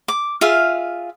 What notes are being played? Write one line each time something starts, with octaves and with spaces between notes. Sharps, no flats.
D6
F4 G#4 E5 F5